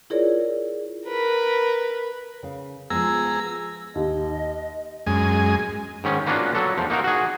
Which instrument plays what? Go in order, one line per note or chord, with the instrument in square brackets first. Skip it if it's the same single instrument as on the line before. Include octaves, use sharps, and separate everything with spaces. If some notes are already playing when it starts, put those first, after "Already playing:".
[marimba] E4 F4 G#4 A#4 C#5 D5
[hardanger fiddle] A#4 B4
[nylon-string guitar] C#3 F5
[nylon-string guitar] F3 G#3 B3 [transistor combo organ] G#4 A#5 [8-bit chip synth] E6
[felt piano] D#2 [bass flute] D#5
[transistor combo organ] F#2 G#3 G#5
[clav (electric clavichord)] G#2 D#3 C#4
A#3 B3 C#4 D4 F4 F#4
F#3 A4
E2 F3
A#3 D#4 F#4 A#4
F#4 G#4